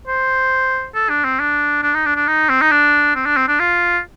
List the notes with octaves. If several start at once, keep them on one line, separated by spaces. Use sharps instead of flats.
C5
A4
D4
C4
D4
D4
D#4
D4
D4
D#4
C4
D#4
D4
C4
D4
C4
D4
F4